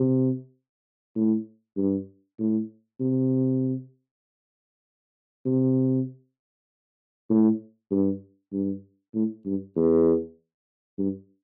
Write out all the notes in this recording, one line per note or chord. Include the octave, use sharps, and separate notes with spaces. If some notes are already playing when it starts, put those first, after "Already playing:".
Already playing: C3
A2
G2
A2
C3
C3
A2
G2
G2
A2
G2
E2
G2